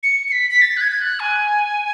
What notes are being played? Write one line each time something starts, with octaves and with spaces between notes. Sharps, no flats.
C#7
C#7
B6
B6
A6
F#6
G#6
G#6
F#6
G#5